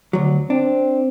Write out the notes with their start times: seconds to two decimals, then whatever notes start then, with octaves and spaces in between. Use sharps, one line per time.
0.13 D2 F#3
0.50 C4 D4